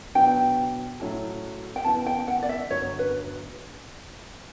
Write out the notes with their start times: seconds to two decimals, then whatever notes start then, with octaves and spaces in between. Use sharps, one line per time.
0.15 B2 F#3 B3 D4 G5
1.00 A2 F#3 C#4 E4 A4
1.76 G5
1.85 F#2 C#3 E3 B3 A5
2.06 G5
2.28 F#5
2.43 D5
2.49 E5
2.70 G1 F#2 D3 F#3 C#5
2.99 B4